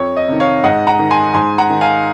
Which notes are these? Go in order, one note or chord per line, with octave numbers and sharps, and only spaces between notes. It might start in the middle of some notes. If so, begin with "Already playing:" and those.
Already playing: F2 C#5
D#5
C3 D#3
C#5 F5
G#2 D#5 F#5
F#5 A#5
D#3
G#5 C6
G#2 G#5 C6
F#5 A#5
D#3
F5 G#5